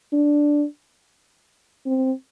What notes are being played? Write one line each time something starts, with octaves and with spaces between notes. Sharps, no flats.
D4
C4